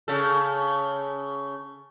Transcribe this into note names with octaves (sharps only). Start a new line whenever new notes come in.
C#3 A4